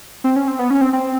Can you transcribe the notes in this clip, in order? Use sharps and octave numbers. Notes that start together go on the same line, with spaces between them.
C4
C#4
C4
B3
C#4
C4
C4